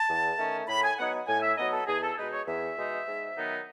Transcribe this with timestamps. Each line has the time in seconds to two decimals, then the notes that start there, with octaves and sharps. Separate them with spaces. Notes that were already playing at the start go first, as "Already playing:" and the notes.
Already playing: A5
0.08 E2
0.38 D#3 A3 C#4
0.68 A2 B5
0.83 G#5
0.98 F#3 B3 D#4 F#5
1.28 A2 G#5
1.42 E5
1.57 F#3 B3 D#4 D#5
1.73 A4
1.87 E2 G#4
2.02 A4
2.17 B2 G#3 D#4 B4
2.32 C#5
2.47 E2 E5
2.77 B2 G#3 D#4
3.06 G#2
3.36 D#3 F#3 B3 D#4